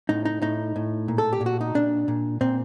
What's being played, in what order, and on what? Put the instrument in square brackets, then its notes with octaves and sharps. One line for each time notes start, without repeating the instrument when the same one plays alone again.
[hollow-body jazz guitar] A2 D#4
D#4
A2 D#4
A2
A#2
A4
G4
A#2
F#4
D#4
A#2 D4
A#2
A#2 C4